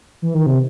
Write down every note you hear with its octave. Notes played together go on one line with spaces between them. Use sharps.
E3
D#3
C3